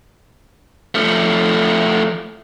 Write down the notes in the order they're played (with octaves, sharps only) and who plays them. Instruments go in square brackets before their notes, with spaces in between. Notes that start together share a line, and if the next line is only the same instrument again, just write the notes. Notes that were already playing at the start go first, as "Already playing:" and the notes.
[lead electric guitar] F3 A3